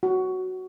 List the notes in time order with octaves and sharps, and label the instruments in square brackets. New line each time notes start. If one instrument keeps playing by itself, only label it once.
[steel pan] F#4